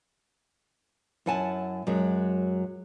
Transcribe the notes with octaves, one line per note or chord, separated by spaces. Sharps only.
F#2 E4 F#5 G#5 A5
F#2 F#3 G#3